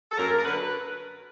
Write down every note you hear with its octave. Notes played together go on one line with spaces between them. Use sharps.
A4
F#2 A#4
A#4
D3 F#3 B4